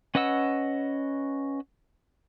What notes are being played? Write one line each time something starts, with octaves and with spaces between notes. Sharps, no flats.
C#4 B4 D#5 F#5 E6